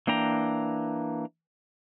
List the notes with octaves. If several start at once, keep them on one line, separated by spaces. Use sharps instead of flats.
E3 A#3 D4 G5 A#5